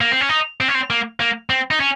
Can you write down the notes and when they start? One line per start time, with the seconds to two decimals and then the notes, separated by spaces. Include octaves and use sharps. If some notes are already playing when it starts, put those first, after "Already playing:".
0.01 A#3
0.11 C4
0.21 C#4
0.29 D#4
0.60 C4
0.68 C#4
0.75 C4
0.90 A#3
1.20 A#3
1.50 C4
1.71 D#4
1.80 C#4